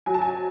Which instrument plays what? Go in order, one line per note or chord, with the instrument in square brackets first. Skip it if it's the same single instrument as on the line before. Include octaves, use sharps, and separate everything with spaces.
[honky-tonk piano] F#3 G#5
A5
G#5